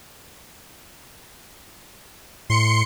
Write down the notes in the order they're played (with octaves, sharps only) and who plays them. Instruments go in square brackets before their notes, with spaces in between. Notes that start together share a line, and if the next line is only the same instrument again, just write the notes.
[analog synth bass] A2 [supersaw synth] C6 C#7